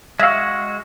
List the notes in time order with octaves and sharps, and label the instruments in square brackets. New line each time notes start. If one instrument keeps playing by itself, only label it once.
[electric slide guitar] G#3 F#4 [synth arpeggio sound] E5 F5